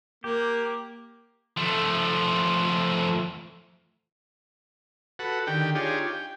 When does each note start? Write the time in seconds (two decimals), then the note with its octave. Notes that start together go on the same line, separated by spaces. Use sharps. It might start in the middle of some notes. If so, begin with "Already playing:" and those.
0.24 A#3 G4
1.57 F3 A3
5.19 F#4 A4 B4 F#5
5.47 D3 D#3 G4 G5
5.75 D4 D#4 F4 G4 G#4 C#5
6.07 G5